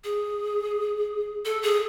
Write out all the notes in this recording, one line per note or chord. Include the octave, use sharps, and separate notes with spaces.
G#4
A4
G#4